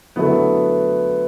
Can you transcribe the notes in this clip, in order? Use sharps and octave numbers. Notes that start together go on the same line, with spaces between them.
D3 F#3 A3 B3 E4 B4